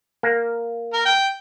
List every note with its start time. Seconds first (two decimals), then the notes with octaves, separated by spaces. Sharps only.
0.23 A#3
0.93 A#4
1.06 G5